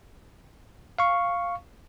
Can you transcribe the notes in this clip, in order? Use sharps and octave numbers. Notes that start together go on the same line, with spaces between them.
F5 C#6